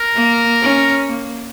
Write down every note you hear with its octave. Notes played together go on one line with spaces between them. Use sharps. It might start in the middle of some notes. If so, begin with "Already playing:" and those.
Already playing: A#4
A#3
C#4
A#3